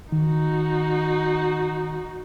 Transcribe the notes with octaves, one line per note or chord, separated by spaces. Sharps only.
D#3 D#4 F#4